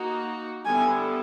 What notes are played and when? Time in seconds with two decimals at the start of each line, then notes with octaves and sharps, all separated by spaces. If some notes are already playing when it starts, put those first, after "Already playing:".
Already playing: A#3 D#4 F#4
0.65 D3 G3 B3 E4 A4 G#5